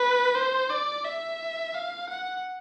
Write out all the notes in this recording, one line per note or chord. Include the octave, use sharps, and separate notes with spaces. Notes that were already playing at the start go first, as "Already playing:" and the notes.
Already playing: B4
C5
D5
E5
F5
F#5